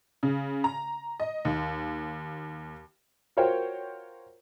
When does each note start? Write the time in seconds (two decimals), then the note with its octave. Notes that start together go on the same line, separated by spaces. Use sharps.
0.23 C#3
0.64 A#5
1.20 D#5
1.45 D#2
3.37 F4 F#4 A#4 C5 C#5 G5